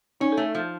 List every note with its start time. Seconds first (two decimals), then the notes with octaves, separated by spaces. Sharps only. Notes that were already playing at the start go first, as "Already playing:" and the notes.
0.21 C#4 D#4
0.32 A4
0.37 A3
0.43 A4
0.55 F3